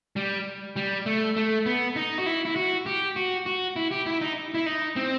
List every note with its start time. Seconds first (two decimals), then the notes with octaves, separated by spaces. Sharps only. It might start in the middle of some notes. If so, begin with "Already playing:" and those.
0.16 G3
0.76 G3
1.06 A3
1.36 A3
1.66 B3
1.96 D#4
2.18 F#4
2.26 E4
2.45 E4
2.56 F#4
2.86 G4
3.16 F#4
3.46 F#4
3.76 E4
3.91 G4
4.06 E4
4.21 D#4
4.54 E4
4.66 D#4
4.96 C4